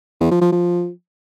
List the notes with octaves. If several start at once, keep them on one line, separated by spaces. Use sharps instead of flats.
E2
F3
F3
F3